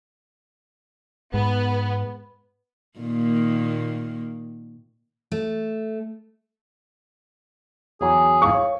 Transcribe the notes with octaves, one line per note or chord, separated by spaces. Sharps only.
G#2 B3
A#2 D#3 A#3
A3
E2 F#3 G#4 G#5
G#1 E2 G#2 F5 C#6
C#5